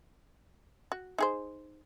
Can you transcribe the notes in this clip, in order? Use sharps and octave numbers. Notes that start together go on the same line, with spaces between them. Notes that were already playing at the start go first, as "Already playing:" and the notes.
F#4
D#4 G#4 C5